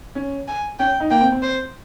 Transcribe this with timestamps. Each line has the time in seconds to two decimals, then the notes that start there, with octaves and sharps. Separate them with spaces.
0.15 C#4
0.48 G#5
0.79 C#4 G5
1.00 D#4
1.10 A#3 G5
1.21 C4
1.32 C4
1.42 C5